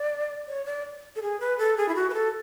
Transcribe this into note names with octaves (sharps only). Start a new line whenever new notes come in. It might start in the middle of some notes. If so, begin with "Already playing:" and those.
Already playing: D5
C#5
D5
A4
G#4
B4
A4
G#4
E4
F#4
B4
A4